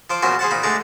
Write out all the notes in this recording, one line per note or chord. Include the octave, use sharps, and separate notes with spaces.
F3 C5 D6
A#1 F#2 A#2 B3 F#4 C5
G#4 C5 F#5 A5
A#2 D#4 B5
D3 G#3 A3 D4 A5 A#5